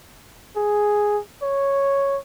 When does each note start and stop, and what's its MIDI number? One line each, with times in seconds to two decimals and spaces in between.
0.56 1.19 68
1.42 2.18 73